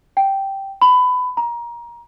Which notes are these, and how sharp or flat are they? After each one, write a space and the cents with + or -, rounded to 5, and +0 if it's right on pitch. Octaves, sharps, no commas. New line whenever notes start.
G5 -5
B5 +20
A#5 +20